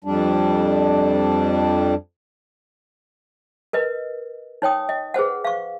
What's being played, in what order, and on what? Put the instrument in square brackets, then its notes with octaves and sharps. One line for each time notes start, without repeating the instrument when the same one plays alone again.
[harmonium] F2 G3 D4
[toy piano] A#4 B4 D#5
D#4 C#5 G5 D#6
D#5
G#4 B4 C5 F#5
F5 C#6